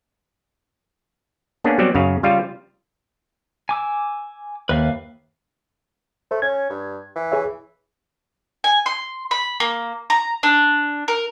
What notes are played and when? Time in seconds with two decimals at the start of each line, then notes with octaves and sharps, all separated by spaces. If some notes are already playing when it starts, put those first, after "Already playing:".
1.64 A#3 B3 C#4 D4 G#4
1.78 F#3 G3 B3 C4 D5
1.95 F#2 C#3 F5
2.23 C#3 G3 F4 F5
3.69 G#5 D6 E6
4.69 D#2 B4 E5 F5
6.31 A3 C5
6.42 C#4 G#6
6.70 G2
7.16 E3
7.32 G#4 C#5 E5
8.64 G#5
8.86 C6
9.31 B5
9.60 A#3
10.10 A#5
10.43 D4
11.08 A#4